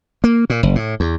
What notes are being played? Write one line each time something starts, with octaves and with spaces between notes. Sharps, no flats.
A#3
A#2
F#1
A2
E2